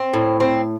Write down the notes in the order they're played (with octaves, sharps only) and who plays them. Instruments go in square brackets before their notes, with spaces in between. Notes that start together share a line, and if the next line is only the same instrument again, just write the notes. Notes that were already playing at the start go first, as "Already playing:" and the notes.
Already playing: [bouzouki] C4
A2
C4